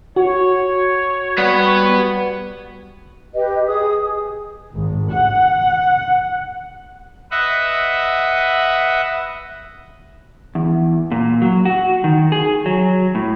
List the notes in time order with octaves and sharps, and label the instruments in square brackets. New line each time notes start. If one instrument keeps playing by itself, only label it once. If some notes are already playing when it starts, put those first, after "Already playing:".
[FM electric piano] F#4 [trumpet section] C#5
[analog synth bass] G3 [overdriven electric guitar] B4 F#5
[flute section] G4 B4 D#5
G#4 D#6
[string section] G#1
F#5
[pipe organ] B4 D#5 E5 F#5
[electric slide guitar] E2
A#2
F#3
F#4
D#3
G#4
F#3
A2